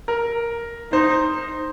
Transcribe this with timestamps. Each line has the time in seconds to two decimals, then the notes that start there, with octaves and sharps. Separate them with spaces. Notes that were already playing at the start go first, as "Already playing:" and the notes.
0.08 A#4
0.92 D#4 C5